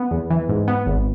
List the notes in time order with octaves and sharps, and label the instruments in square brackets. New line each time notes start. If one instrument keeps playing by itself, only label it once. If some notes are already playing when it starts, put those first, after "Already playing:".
Already playing: [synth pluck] B3
E2
E3
G#2
B3
G#1